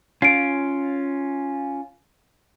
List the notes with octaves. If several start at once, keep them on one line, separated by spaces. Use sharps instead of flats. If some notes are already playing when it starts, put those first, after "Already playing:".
C#4 F4 C7 D7